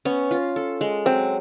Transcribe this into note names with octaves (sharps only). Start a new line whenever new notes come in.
B3 C#4
F4
A4
G#3
F#3 C4